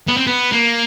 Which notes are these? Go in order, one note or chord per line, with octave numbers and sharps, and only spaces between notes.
B3
C4
B3
A#3